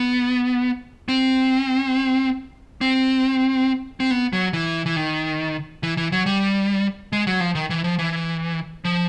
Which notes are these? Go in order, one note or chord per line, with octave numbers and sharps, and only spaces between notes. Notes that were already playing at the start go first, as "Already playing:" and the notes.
Already playing: B3
C4
C4
C4
B3
F#3
E3
E3
D#3
E3
E3
F#3
G3
G#3
F#3
F3
D#3
E3
F3
E3
F3